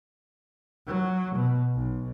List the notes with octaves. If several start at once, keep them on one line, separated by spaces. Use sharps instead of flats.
F#3
B2
B1